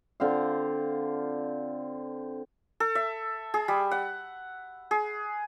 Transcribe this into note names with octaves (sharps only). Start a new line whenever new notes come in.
D3 C4 F4 F5
A4
E5
G#4
G3
F#5
G#4